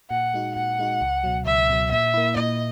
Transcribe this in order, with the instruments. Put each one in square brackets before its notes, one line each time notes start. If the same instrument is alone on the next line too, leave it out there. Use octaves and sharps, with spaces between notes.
[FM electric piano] A#2 [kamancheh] F#5
[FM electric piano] G#3 D#4 F#4
[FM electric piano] A#2 [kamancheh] F#5
[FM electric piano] G#3 D#4 F#4
C#2
B2 F#3
[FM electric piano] C#2 [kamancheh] E5
[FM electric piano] B2 F#3
[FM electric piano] A#2 [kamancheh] E5
[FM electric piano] A#3 E4
[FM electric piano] A#2 [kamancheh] D#5